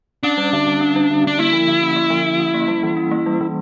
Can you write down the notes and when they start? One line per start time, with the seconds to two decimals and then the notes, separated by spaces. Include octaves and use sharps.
0.23 C#4 D4
0.37 G3
0.53 D3
0.67 D3
0.81 C#4
0.96 G3
1.11 D3
1.24 D3 D4
1.39 A#3 E4
1.53 F3
1.68 D3
1.82 C#4
1.96 A#3
2.10 F3
2.25 D3
2.40 C#4
2.54 A#3
2.68 G3
2.83 E3
2.97 C#4
3.11 A#3
3.26 G3
3.41 E3